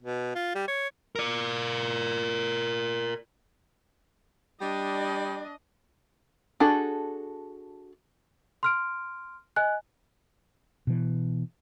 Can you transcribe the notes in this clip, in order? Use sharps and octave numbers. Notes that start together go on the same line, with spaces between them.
B2
F4
G3
C#5
A#4 D5
G3 D4 D#5
D4 F#4 G#4 A4
C6 F6 D7
D#5 G#5 F#6
B2 E3